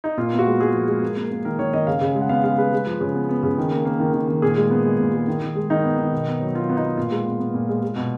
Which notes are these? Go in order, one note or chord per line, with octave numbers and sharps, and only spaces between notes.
D#4
A#2 F4
B3
F#4
G#3
G#3 G#4
F3
G#3
A#3
A#3
A#3
D#3 A#4
D#3 C#5
D#3 D#5
C#3 F5
C#3
G#3
F#5
B3 F5
G#3 F5
G#3 B4
G#3
F3
C#3
B3
B3
C#3
D#3
A#3
A#3
D#3
D#3
D#3
A#2 G#4
G#3
B3
G#3
A#2
G#3
D#3
D#3
G#3
D#3 D#4
B3
D#3
B2
B3
F#3
F#3 F4
B3
D#4
B3
A#2 F4
G#3
B3
B3
A#2
G#3
G#3
B2